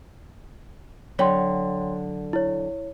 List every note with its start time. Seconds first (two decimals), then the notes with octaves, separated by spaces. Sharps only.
1.19 D3 F#3 C#5 G5 B5 C6
2.33 E4 C#5